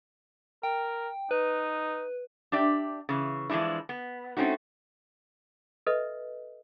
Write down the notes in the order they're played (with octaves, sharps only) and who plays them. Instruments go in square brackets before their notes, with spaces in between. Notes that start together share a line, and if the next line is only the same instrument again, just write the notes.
[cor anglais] A#4 [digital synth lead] G5
[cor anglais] D#4 [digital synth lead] B4
[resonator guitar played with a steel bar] D4 G4 D5 E5 G5
C#3 E3
E3 F3 G#3 D4 E4
B3
A3 C4 C#4 D#4 F#4
[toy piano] A4 B4 D#5 E5